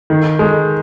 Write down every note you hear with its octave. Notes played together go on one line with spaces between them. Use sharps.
D#3
G#3